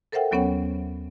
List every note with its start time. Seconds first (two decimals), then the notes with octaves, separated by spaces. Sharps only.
0.12 A4 A#4 C5 E5 F#5 G5
0.31 D#2 F#3 B3 C#4 C#5 F#5